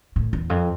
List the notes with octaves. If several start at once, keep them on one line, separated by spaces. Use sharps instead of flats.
A2
E2
F2